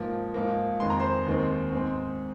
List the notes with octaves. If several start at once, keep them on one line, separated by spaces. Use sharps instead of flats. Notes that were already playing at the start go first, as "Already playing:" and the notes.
Already playing: G#2 F3 A#3
G#2 F3 A#3
F2 D#3 G#3 C6
A#5
C5 C6
D#2 D#3 G#3 C4
G#2 G#3 C4